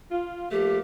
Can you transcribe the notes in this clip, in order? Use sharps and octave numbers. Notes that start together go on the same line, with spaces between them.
F4
F3 A3 A#3 G4